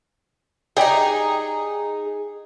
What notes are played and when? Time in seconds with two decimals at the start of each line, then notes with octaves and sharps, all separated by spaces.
0.77 D#4 G4 G#4 D5 G5